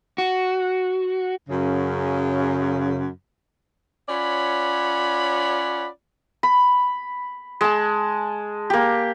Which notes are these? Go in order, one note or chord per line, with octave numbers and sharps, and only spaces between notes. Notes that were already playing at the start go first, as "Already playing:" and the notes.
F#4
F#2 C#3
C#4 F4 C#5 D5 F#5 B5
B5
G#3 A5
A#3 G4